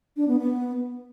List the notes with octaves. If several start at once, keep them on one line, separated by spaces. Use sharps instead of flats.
D4
B3
B3